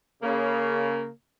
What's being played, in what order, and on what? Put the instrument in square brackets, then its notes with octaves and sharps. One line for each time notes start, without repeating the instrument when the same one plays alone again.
[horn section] C#3 A#3